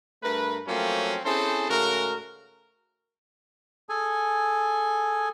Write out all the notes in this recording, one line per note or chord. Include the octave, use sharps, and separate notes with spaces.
G2 A3 A#4 B4
F3 F#3 A3 A#3 C4 C#4
C4 C#4 E4 G#4 A4 C5
G#2 C#3 A3 F#4 A#4
G#4 A4 G#5